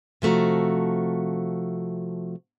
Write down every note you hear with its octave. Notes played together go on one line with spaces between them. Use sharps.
C3 F3 A3 F#4 A#5